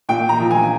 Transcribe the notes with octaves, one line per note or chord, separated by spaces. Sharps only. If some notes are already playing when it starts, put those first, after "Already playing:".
A#2 G5
A#5
F3
G#5